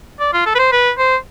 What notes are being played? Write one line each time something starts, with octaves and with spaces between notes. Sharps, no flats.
D5
F4
A4
B4
C5
B4
C5